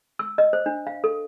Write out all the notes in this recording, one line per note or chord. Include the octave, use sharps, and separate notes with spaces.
E6
D#5
C5
D4
F5
A4